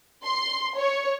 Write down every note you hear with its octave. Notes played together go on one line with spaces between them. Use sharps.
C6
C#5